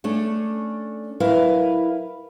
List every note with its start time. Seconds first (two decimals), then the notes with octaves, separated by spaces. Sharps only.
0.04 A3 C#4 D4
1.20 F#3 E4 A#4 B4 F5